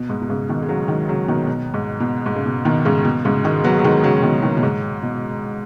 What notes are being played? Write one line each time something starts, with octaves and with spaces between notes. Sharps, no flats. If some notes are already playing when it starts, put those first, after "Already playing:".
Already playing: B2
G#2
B2
G#2 C#3
B2 D#3
G#3
C#3 F#3
D#3 G#3
C#3 F#3
B2 D#3
B2
G#2
B2
G#2
C#3
B2
B2 D#3
G#2 C#3
B2
G#2 C#3
D#3 G#3
F#3 B3
F#3
D#3 G#3
C#3 F#3
B2 D#3
B2 D#3
B2
G#2
B2